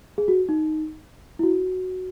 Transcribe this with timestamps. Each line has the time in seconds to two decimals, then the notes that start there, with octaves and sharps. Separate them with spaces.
0.18 G#4
0.28 F#4
0.49 D#4
1.39 E4
1.43 F#4